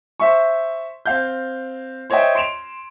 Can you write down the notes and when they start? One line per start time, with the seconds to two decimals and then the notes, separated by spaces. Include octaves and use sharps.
0.20 C5 E5 C#6
1.06 C4 F5 G6
2.10 C5 C#5 D#5 E5 G5
2.35 C6 D7 E7 F7